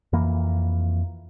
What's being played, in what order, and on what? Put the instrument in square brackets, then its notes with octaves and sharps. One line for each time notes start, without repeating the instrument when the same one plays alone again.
[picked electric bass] F2 E3 A#3